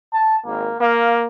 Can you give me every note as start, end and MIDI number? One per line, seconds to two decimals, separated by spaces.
0.14 0.37 81
0.46 0.69 32
0.46 0.75 58
0.80 1.27 58
0.80 1.14 77